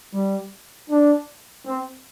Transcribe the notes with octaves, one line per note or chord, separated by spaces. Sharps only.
G3
D4
C4